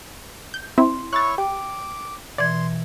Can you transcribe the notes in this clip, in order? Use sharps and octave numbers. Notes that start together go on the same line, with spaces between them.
G6
C4 E4 C6
E4 C#5 C#6 F#6 A6
G4 G5 D6
B2 E3 D5 C6 G#6